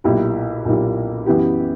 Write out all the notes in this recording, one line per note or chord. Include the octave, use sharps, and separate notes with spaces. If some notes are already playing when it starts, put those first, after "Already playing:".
B1 A#2 A#3 E4 G4
B1 A#2 A#3 E4 G4
F#2 E3 B3 E4 G4